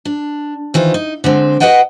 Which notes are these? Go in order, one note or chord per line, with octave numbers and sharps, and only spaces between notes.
D4
D#3 E3 F4 C5
D#4
D3 G#3 C4
F#4 G4 B4 D#5 F#5 G5